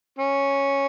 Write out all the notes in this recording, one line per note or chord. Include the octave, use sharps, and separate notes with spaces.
C#4